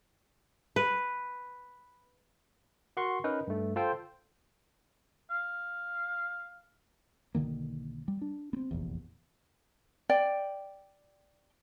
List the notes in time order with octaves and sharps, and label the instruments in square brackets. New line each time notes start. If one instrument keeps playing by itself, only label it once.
[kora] B4
[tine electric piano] F#4 A#4 F#5 C6 C#6
C#4 D#4 A#4 B4
G2 A3
F4 A4 C5 G5
[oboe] F5
[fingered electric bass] B1 D3 D#3 A#3
G3
D4
B3 C4
F1 A#1 E2
[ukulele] D5 G5